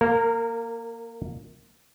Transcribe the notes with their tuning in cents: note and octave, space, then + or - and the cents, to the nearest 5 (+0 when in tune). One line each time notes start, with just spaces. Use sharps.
A#3 +0 A#4 -25